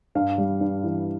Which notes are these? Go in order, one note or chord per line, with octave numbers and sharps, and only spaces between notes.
G2 F5
G3
G2
E3